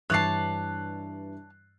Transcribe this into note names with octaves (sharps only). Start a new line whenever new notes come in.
G2 E3 C#5 D5 A5 F#6 C7